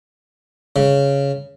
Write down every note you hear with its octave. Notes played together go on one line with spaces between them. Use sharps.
C#3